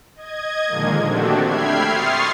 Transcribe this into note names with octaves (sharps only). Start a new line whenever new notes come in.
D#5 G#6
A#2 D3 D#3 F3 G#3 A#3
A3 C4 D4 F#4 G4 A4
E5 G5 B5 F6 G#6 C7
C6 C#6 D#6 F6 A6 C7